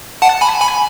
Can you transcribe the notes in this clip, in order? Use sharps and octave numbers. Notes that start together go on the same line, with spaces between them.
F#5 A5
G#5 B5
G#5 B5